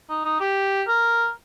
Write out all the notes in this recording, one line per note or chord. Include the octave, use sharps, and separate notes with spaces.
D#4
D#4
G4
A#4